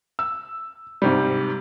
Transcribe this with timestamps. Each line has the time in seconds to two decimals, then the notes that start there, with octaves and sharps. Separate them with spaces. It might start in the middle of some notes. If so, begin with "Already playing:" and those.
0.19 E6
1.02 G#2 C3 G3